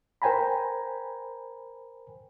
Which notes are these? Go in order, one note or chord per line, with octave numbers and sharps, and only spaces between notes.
A#4 C5 G5 G#5 A#5 B5